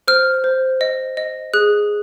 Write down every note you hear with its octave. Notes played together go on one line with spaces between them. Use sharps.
C5 F6
C5
D#5
D#5
G#4 F#6